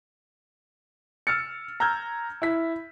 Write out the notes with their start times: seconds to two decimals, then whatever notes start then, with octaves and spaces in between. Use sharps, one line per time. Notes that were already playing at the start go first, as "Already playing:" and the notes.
1.27 E6 F6 A6 C#7
1.80 A#5 E6 F6 G6 G#6
2.42 E4 B6